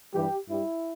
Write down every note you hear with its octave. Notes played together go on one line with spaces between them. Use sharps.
G2 E3 G3 G4
G2 G3 E4